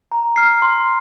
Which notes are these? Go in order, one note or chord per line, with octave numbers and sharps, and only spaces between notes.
A#5
F6 C7
C6